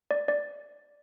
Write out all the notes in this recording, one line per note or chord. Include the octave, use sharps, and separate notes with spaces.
D5
D5